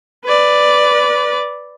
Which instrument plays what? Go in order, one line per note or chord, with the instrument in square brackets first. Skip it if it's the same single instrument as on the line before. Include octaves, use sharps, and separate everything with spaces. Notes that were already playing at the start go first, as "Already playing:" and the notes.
[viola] B4 D5